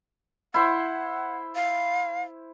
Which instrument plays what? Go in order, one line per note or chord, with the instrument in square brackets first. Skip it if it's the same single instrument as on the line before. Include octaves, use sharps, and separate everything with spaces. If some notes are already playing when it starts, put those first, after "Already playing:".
[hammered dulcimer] E4 C5 [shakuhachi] F#5
[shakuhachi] F5